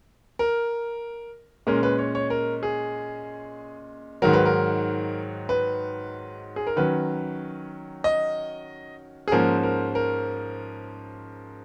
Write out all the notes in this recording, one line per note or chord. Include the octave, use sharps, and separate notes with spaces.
A#4
A#2 G#3 C#4 A#4
B4
C#5
C#5
A#4
G#4
G#2 D#3 F#3 A#4
B4
A#4
B4
G#4
A#4
D#3 F#3 C#4 B4
D#5
G#4
G#2 F3 A#3 C#4 A#4
A#4
A#4